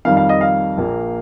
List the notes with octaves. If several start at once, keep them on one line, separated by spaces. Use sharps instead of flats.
F2 D#3 G3 F5
F5
D#5
F5
A#1 A#2 A#3